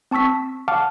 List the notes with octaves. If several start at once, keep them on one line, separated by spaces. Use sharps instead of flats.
C4 A5 C#6 E6 B6
F5 F#5 A5 D6 F6